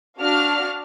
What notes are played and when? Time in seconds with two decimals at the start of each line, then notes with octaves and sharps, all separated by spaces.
0.19 D4 F#4 F5 F6